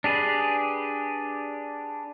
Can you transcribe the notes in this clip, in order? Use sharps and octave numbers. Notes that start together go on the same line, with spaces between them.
D4 G4 G#4 B4